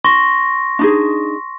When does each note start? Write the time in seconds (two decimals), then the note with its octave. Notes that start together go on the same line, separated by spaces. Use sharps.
0.05 C6 C#6 A#6
0.79 D4 D#4 G#4